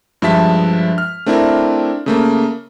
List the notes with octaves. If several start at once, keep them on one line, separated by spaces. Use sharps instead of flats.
G2 F3 G#3 E5 A5 B6
F6
A3 C4 D4 E4 A#4
C#3 A3 A#3